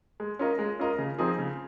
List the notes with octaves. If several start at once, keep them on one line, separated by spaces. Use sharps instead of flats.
G#3
C#4 F4 A#4 D#5
G#3
C#4 F4 A#4 D#5
C#3
F3 C4 D#4 G#4
C#3